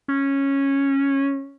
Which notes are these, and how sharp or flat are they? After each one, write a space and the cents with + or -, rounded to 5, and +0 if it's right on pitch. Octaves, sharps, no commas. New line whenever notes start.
C#4 -10